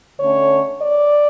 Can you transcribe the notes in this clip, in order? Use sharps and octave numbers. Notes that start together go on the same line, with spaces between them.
D3 A3 C#4 C#5
D5